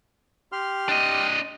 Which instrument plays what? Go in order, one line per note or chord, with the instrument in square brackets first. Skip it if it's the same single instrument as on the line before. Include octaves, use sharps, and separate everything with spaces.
[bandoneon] G4 C6 F6
[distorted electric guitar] D4 D#5